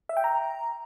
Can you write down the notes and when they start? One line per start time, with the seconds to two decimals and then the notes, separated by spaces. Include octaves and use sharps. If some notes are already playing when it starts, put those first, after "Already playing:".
0.09 E5
0.17 G5
0.24 A#5